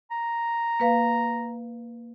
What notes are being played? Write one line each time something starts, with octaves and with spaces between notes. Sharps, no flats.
A#5
A#3 B4 F5